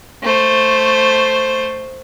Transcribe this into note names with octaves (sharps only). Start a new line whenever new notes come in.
A3 C5